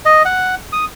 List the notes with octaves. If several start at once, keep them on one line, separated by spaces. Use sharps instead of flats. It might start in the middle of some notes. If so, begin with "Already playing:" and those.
D#5
F#5
D#6